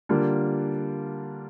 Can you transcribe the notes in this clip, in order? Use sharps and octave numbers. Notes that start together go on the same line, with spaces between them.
D3 G3 A#3 D4 F4